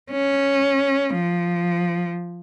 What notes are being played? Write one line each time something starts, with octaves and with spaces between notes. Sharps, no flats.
C#4
F3